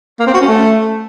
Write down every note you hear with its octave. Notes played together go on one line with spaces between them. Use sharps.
A#3
C4
F#4
C#4
A3